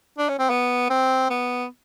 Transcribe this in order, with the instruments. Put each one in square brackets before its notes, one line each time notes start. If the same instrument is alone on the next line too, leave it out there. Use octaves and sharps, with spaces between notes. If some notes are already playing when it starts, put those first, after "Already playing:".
[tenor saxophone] D4
C#4
C4
B3
C4
B3